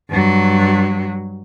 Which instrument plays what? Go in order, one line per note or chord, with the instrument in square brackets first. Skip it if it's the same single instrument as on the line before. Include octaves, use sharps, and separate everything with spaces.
[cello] G2 F#3